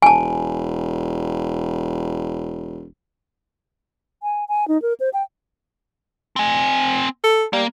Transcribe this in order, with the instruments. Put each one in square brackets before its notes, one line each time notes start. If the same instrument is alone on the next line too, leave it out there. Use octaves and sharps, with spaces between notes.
[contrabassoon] E1 [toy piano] G#5 A5
[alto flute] G#5
G#5
D#4
A#4
C5
G5
[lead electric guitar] C4 G#5
[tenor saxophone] A4
[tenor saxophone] G3 [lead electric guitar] A#3